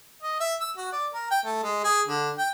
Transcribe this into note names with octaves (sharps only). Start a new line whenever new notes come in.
D#5
E5
E6
F#4
D5
A#4
G5
A3
G#3
G#4
D3
G5